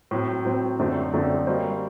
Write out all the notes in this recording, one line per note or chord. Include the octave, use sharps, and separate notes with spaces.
A2 F#3 C4
A2 F#3 C4
F#2 D3 A3 C4
F#2 D3 A3 C4
G3 A#3 F#4 C5 D#5